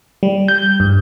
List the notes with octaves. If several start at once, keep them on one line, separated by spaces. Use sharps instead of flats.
G3
G6
G2